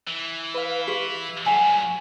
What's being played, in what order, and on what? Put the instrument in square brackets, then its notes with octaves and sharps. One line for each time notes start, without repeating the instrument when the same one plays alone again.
[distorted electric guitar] E3
[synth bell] B4 F5
[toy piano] G4 [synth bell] B6
[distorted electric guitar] G2 F#3 [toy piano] F#5 G#5